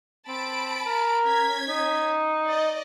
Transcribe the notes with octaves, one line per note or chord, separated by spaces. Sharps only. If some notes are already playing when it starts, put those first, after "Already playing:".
C4 A5 B5 D7
A#4
C#4 G#6 B6
D#4
D5 D#5